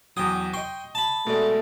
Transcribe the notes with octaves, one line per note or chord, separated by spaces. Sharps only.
E2 F#3 G5 D#6
D#5 G5 C6 C#6
A5 B5
B2 G#3 A3 D5